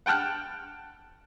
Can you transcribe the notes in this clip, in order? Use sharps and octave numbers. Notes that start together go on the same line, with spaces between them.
F#5 G5 A5 F6 F#6